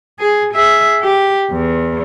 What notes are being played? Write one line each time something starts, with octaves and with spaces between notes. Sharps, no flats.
G#4
G#4 E5
G4
E2